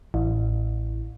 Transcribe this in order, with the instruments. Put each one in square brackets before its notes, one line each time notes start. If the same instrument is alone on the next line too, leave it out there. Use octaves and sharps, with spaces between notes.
[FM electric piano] A1